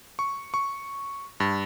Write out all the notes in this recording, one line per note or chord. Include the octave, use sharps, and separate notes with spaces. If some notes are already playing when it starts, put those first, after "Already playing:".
C#6
C#6
G2